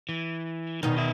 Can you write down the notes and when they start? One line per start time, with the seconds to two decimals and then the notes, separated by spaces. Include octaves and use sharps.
0.09 E3
0.83 E2 B2 D#3 D#4
0.97 D#4 E5